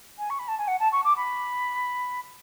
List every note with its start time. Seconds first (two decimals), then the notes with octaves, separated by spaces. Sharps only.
0.18 G#5
0.30 C#6
0.39 B5
0.48 A5
0.58 G#5
0.67 F#5
0.79 A5
0.92 C#6
1.04 D6
1.16 B5